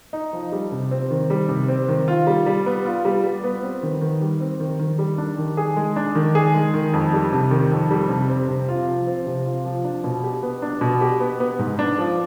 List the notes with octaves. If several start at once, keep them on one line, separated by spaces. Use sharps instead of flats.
D#4
F3
G3
C3
C4
D#3
G3
C3
C4
D#3
F4
G3
G3
B3
F4
G3
G3
B3
C4
D#3
D#3
G3
C4
D#3
D#3
G3
D4
D#3
G#4
G#3
D4
D#3
G#4
G#3
D#3
F2
G3
C3
D#3
F2
G3
C3
C4
C3
F4
F3
C4
C3
F4
F3
D4
B2
G4
B3
D4
B2
G4
B3
B3
G#2
D4
F3